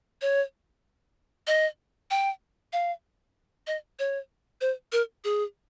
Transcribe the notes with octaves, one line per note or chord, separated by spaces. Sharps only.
C#5
D#5
G5
F5
D#5
C#5
C5
A#4
G#4